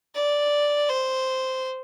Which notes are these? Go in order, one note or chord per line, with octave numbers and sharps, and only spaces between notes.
D5
C5